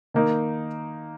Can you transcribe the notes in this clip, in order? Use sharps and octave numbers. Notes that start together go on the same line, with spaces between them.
D#3 A#3 D#4